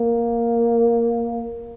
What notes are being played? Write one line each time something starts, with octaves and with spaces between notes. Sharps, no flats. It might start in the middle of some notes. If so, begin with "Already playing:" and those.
Already playing: A#3